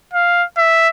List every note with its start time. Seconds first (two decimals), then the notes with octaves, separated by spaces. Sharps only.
0.13 F5
0.57 E5